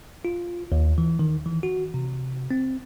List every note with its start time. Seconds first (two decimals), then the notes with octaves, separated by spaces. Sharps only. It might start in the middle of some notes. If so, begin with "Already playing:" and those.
0.25 F4
0.72 D#2
0.98 E3
1.19 D#3
1.46 E3
1.63 F#4
1.94 C3
2.51 C4